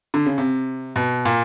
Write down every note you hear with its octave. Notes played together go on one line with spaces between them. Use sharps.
D3
C#3
C3
B2
A#2